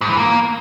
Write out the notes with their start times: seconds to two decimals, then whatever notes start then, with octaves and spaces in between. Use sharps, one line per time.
0.01 G#2
0.09 E3
0.17 A#3